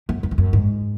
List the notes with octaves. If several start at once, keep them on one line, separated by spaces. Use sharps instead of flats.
F#2
F#2
E2
F#2
G#2